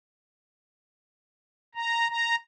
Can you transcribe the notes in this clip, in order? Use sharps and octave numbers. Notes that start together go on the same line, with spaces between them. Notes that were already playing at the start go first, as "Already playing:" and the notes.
A#5
A#5